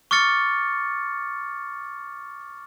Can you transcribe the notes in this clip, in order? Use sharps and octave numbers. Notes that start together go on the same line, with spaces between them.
C#6 D6 F6 A6 C#7